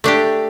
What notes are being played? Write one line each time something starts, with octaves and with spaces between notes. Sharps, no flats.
A3 D4 G4